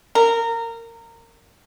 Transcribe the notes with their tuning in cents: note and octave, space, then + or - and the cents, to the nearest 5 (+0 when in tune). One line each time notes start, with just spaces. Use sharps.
A#4 -20